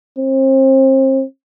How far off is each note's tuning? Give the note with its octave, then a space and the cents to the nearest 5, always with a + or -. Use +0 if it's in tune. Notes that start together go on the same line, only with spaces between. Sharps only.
C4 +35